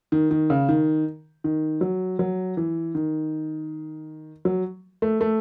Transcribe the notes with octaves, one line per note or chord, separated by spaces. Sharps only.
D#3
D#3
C#3
D#3
D#3
F#3
F#3
E3
D#3
F#3
A3
A3